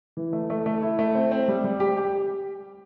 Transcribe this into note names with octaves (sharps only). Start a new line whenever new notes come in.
E3
A3
A3
A3
E4
A3
C4
C4
G3
G3
G4
G4